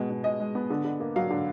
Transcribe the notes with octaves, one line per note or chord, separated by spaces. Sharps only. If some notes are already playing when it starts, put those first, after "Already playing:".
Already playing: B2 G#3
B2
G#3 D#5
G#3
B3
D3
D3
A#3
F#3 F5
D3